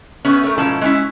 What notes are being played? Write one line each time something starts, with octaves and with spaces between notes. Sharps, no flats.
A3 B3 C#4
A3 A#4
G#2 B2 F3 C#4 E4 A5
G#3 C#4 E4